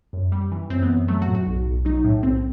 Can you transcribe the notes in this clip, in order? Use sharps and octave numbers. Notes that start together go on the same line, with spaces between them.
F#2
G3
E3
F#2 C4
B3
F#2
F#3 A3
F#4
A2
F#4
B1
B1
F#3 D#4
A2
B1 C4